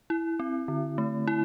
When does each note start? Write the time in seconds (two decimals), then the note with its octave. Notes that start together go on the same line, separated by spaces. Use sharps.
0.10 E4
0.40 C4
0.68 D3
0.98 A3
1.27 E4